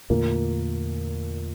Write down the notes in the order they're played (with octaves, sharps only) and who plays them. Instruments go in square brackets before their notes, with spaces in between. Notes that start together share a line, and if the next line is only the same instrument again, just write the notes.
[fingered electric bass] E2 D3 A3 [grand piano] A#2 A#3